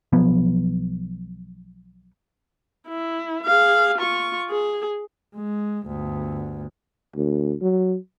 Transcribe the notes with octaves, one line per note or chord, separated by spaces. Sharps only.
B1 F3 B3
E4
G#4 F5
F4 C#6
G#4
G#3
G1 D2
D2
F#3